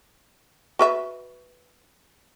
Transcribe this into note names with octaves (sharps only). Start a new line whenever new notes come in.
F#4 B4 E5